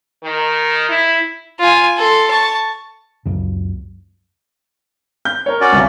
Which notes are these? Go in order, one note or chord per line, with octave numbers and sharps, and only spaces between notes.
D#3
E4
F4 G#5
A4 C6
A5 C#6
C#2 F#2 C#3
G6
A#4 C#5
C#4 F#4 D5
G1 C2 G2